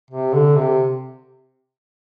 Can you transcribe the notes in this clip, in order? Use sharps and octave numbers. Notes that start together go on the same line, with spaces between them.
C3
D3
C3